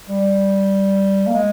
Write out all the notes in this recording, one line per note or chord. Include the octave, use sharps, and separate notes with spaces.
G3
A#3
G#3